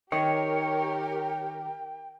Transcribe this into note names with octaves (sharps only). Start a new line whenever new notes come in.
D#3 G4 A#4 C#5 G5